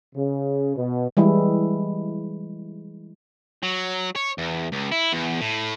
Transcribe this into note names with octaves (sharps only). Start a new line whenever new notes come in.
C#3
B2
E3 G3 G#3 E4
F#3
C#5
E2
C#2
E4
E2
A2